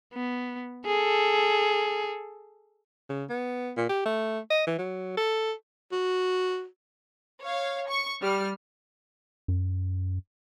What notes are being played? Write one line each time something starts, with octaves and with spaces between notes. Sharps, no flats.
B3
G#4 A4
C#3
B3
A#2
G4
A3
D#5
E3
F#3
A4
F#4
C#5 F5
C#6
G3 F6
F#2